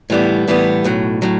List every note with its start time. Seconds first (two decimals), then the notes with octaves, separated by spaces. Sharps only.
0.10 A2 E3 G3 B3
0.48 A2 E3 G3 B3
0.84 B1 A2 F#3
1.22 A2 F#3